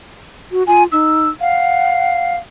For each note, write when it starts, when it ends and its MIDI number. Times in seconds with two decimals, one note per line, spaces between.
0.52 0.63 66
0.67 0.86 65
0.67 0.83 80
0.92 1.28 63
0.92 1.29 88
1.40 2.37 77
1.40 2.32 78